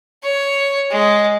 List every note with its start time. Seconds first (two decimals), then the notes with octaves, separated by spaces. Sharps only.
0.23 C#5
0.91 G#3